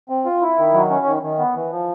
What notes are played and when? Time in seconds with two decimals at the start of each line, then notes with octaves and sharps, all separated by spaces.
0.09 C4
0.25 F4
0.42 E4
0.58 D#3
0.74 F#3
0.90 C#4
1.06 D#3
1.22 D#3
1.38 B3
1.55 E3
1.71 F3